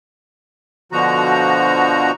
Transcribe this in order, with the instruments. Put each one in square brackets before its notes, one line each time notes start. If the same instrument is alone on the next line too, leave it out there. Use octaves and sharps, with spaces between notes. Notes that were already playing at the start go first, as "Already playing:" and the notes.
[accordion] B2 D3 F3 F#4 A#5